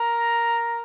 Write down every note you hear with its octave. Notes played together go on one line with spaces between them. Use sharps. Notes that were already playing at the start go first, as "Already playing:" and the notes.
Already playing: A#4 A#5